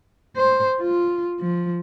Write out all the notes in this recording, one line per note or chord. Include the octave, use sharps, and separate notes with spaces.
C5
F4
F3